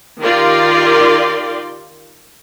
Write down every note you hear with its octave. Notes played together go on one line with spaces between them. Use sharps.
D#3 F4 G4 A#4 D5 C6